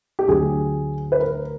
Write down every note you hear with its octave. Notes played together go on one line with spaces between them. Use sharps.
G4
D2 D3 F#3 G#4
B4
A#4